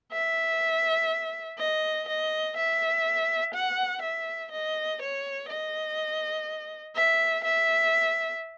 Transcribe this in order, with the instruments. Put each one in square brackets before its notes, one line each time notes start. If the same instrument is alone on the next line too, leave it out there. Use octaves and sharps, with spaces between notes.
[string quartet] E5
D#5
D#5
E5
F#5
E5
D#5
C#5
D#5
E5
E5